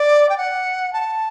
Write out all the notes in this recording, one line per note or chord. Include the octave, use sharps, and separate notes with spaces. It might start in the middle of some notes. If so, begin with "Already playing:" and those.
Already playing: D5
G5
F#5
A5